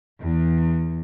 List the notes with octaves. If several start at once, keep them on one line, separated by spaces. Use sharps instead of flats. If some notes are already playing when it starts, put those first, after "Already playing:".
E2